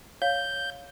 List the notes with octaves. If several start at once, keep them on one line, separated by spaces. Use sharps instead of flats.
C#5 F5 G6